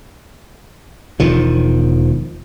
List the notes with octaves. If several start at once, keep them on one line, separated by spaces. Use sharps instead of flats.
E1 E2 D#3 F3